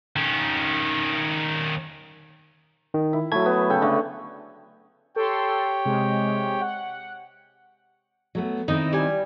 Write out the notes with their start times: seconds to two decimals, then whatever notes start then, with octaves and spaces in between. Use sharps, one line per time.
0.16 D#3 C#4
2.94 D#3
3.13 E4
3.32 F#3 A3 A5 B5 G#6
3.46 B3
3.70 C#3 A4 G5
3.82 D3 A3
5.16 G4 A4 C#5 G5 C6
5.85 C3 G#3
6.61 F#5
8.35 F#3 A3 B3
8.68 D#3 C4 D#4 E4
8.93 G3 G#5